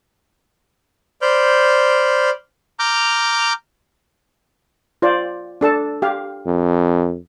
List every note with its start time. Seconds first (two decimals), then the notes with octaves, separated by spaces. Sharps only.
1.22 C5 D5 B5 F6 G6
2.79 A#5 D6 F6 G6
5.02 F4 C5 D5
5.61 D4 A4 A5
6.02 G4 F5
6.47 F2